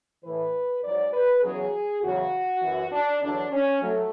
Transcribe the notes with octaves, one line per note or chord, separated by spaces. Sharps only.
A2 E3 B4
G#2 F#3 D5
B4
E2 C#3 F#3 G#4
E2 C#3 F#3 F#4
F#2 E3
D4
E2 D3 F#3 D4
C#4
F#3 A3